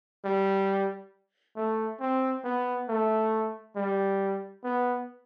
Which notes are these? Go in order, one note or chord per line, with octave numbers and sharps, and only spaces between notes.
G3
A3
C4
B3
A3
G3
B3